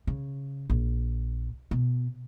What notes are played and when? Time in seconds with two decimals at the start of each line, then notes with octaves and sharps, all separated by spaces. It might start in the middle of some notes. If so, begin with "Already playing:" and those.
0.07 C#3
0.70 A#1
1.71 B2